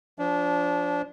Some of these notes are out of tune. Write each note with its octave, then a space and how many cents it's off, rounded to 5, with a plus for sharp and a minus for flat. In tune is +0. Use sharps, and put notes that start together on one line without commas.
F3 +0 D4 -25